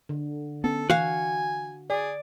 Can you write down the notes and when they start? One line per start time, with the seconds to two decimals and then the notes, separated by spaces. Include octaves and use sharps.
0.09 D3
0.64 B3 C#4 A4
0.90 E3 F#4 F5 G#5
1.90 G#4 D5